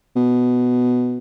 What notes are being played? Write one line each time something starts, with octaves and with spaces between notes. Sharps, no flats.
B2